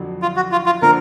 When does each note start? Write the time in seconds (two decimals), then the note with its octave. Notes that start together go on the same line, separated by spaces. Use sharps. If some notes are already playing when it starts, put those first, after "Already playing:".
Already playing: F2 D3 F#3 D4
0.22 F4
0.36 F#4
0.52 F4
0.66 F4
0.82 D3 F3 A#3 D4 A#4